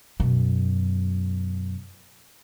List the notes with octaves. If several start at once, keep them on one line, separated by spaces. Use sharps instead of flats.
F#2 B2